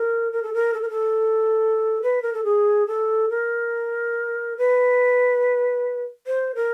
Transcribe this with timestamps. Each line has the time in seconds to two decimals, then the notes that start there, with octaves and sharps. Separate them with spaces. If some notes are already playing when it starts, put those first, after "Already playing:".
Already playing: A#4
0.33 A#4
0.43 A4
0.54 A#4
0.74 A4
0.82 A#4
0.90 A4
2.02 B4
2.22 A#4
2.34 A4
2.44 G#4
2.87 A4
3.30 A#4
4.58 B4
6.27 C5
6.55 A#4